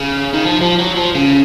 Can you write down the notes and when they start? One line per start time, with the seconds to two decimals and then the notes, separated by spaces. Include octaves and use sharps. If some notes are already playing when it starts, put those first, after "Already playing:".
Already playing: C#3
0.34 D#3
0.45 F3
0.62 F3
0.79 F#3
0.97 F3
1.15 C#3